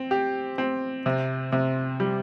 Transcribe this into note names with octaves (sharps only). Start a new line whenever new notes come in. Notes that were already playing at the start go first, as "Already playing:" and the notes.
Already playing: C4
G4
C4
C3
C3
G3